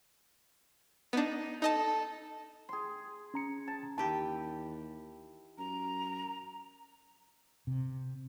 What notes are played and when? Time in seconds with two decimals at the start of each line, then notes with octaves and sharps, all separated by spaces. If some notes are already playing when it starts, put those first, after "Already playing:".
1.13 B3 D4 D#4
1.62 D#4 A4 D#5 A5
2.69 G#4 C6
3.34 C#4 A#5 C#7
3.68 A5
3.98 D#2 E3 G4 G5 A5
5.58 F#2 A#5
7.67 C3